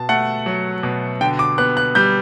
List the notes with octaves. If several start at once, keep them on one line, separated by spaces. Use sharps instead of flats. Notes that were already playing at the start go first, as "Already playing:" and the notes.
Already playing: B2 A5
A3 F#5
F#3
B2
D3 G5
D6
B3 F#6
F#6
G3 G6